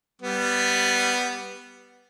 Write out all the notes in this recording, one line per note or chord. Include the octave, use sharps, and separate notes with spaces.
G3 B3